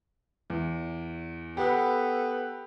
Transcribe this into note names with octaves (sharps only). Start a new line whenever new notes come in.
E2
B3 G4 A4 B4